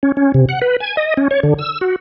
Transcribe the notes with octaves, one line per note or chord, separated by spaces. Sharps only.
C#4
C#4
C3
F#5
B4
G#5
D#5
C#4
C#5
D3
E6
F#4